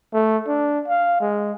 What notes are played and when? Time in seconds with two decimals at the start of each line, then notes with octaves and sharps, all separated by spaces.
0.13 A3
0.47 D4
0.88 F5
1.21 G#3